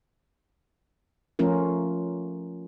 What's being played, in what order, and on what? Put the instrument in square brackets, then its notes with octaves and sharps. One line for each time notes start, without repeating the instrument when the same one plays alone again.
[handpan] F3 A3 C#4 F4 A#4